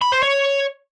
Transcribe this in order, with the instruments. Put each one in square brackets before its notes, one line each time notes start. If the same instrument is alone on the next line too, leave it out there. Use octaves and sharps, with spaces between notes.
[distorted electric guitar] B5
C5
C#5